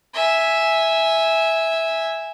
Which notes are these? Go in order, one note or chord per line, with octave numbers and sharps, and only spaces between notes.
E5 G#5